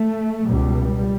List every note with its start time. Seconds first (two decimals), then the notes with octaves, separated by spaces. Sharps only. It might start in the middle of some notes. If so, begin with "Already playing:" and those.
Already playing: A3
0.48 C#2 B2 G3